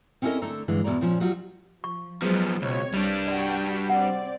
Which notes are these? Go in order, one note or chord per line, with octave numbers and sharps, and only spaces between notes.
C4 C#4 E4 A4 A#4 D#5
D3 A3 A4 A#5
G2 D3 E3 G#3
E2 B2 E4 D5 A#5
A#2 F3 C#4
F#3 G3 D#4 F4 F#4
F3 C#6
F3 F#3 G#3 B3 C5
C#2 B2 C4 C#5
C2 G3 D4
F#4 D5 G5
C4 D5 F#5